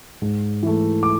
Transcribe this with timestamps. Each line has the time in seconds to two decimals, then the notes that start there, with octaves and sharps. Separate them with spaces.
0.22 G#2
0.63 E3 A3
1.03 D6